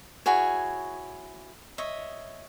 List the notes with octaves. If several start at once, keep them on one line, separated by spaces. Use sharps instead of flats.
E4 F#4 G#4 C#5
C#5 D#5 E5